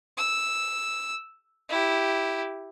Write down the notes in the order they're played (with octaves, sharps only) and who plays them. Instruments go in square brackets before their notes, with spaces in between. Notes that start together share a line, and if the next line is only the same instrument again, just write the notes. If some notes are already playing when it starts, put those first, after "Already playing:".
[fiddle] E6
E4 G4